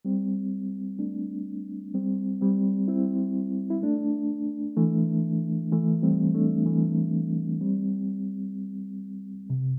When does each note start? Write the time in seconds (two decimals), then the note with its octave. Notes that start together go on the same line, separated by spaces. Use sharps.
0.05 G3 C4
0.99 A3 D4
1.94 G3 C4
2.41 G3 C4
2.88 C4 E4
3.70 E4
3.82 A3 D4
4.77 E3 A3
5.72 E3 A3
6.03 G3 C4
6.35 A3 D4
6.66 E3 A3
7.61 G3 C4
9.50 C3